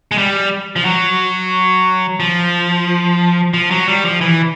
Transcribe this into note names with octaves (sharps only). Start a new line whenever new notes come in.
G#3
G3
F3
F#3
F3
F3
F#3
G3
F3
E3